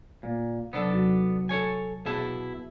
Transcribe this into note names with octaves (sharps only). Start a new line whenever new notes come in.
A#2
C3 F#3 B3 D4 A4 A5
D#2 F#3 F#4
A4 C#5 G#5
B2 E4 G#4 A5